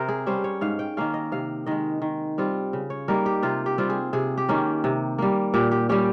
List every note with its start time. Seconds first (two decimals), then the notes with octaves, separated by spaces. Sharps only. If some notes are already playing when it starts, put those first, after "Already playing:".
Already playing: C3 A#4 C5
0.08 G#4
0.26 G3 C#4 C5
0.44 C#5
0.61 G#2 F5
0.79 G5
0.97 D#3 A#3 C#4 F5
1.14 D#5
1.32 C3 F5
1.66 D#3 G#3 D#5
2.02 D#3
2.38 G3 C4 F4
2.73 C#3
2.90 C#5
3.08 G3 A#3 D#4 A#4
3.26 G4
3.43 C3 F4
3.66 G4
3.78 G3 C4 F4
3.90 G#4
4.13 C3 G#4
4.38 G4
4.49 D#3 A#3 C#4
4.84 C3
5.18 G3 A#3
5.54 A#2 G4
5.71 G4
5.89 G3 C#4 G4